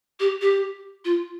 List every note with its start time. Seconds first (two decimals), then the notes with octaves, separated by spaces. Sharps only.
0.20 G4
0.41 G4
1.05 F4